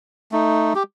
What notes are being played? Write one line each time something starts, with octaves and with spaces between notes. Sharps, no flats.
A3 D#4
G4